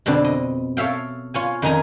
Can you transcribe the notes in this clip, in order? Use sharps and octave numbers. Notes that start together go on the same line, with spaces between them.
F2 B2 D3 C4 D4
D#5
A4 C#5 E5 F5 G5
F4 C#5 G#5
F2 D#3 C#4 D#4 G#5 A#5